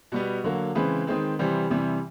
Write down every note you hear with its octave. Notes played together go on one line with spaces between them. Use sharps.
B2 G3 B3 F#4
D3 F#3 A#3
C#3 E3 G#3 C4 B4
D#3 G#3 C4
C3 E3 G3 C4
C3 E3 G3